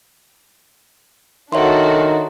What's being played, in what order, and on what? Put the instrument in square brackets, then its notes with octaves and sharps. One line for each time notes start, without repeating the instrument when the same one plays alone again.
[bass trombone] D#3 [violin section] D4 F#4 A4 [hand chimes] C#5 E5 C6